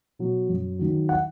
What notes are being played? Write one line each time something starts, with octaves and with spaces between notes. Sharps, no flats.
B2 F#3
F#2
D#3 F#3
F#5